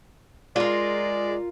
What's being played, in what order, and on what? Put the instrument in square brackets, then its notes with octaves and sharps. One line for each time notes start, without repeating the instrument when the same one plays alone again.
[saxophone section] G#3 D5 [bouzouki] F4 A#4